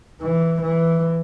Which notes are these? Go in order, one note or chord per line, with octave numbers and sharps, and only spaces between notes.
E3
E3